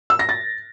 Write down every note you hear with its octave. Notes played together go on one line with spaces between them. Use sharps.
E6
A#6
A6